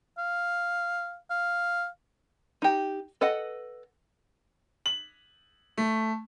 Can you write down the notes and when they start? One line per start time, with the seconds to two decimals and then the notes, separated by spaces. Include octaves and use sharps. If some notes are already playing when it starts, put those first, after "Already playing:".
0.18 F5
1.30 F5
2.62 D#4 G4
3.21 A4 B4 D#5 F#5
4.86 F#7
5.77 A3